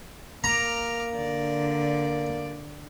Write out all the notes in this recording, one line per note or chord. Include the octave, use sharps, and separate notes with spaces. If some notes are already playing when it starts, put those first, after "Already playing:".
A#3 A#5 D6 F6
D3 D5